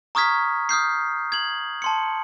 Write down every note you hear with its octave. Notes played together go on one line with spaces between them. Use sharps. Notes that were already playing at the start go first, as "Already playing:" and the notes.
A#5 C#6 D#6 F6 G#6 B6
D#6 F6 G6 C7
G#6 F#7
A5 C6 C#7